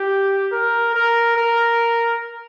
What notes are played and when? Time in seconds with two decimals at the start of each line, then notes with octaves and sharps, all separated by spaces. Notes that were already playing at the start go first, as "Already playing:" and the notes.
Already playing: G4
0.52 A#4
0.94 A#4
1.36 A#4